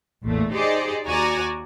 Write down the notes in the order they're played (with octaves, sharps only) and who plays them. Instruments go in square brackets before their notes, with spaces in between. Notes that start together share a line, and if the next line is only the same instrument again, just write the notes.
[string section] A1 E2 A#2 A3
D#4 G4 G#4 C5 D5 D#5
D#2 F#4 D5 G#5 A#5